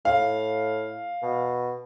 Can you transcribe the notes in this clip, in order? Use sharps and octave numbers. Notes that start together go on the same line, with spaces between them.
A2 F5
B2